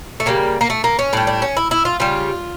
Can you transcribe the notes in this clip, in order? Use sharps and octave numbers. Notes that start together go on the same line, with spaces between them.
A3
C#3 G3 A#3
A#3
A3
A#3
C#4
A2 G3 D4
D4
C#4
E4
E4
F4
C#3 G3 F4